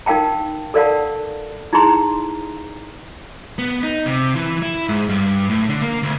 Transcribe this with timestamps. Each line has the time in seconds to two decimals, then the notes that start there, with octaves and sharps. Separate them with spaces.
0.06 D#4 A#4 F5 G5 A5
0.74 A4 A#4 D5 F5 F#5 A5
1.73 D#4 E4 G#4 A#5 C6
3.58 B3
3.83 D#4
4.06 C3
4.36 E3
4.62 E4
4.89 G#2
5.09 G2
5.50 A2
5.69 D3
5.82 A#3
6.03 D2